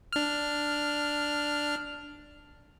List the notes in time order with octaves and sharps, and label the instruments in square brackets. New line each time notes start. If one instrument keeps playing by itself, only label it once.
[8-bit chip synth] D4 F6